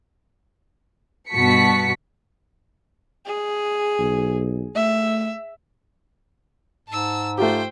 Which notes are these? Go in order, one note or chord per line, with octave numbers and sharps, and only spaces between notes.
G2 B2 F#4 A5 B6 C#7
G#4
B1
A3 E5
G#2 A5 E6
A3 F4 G4 C5 G5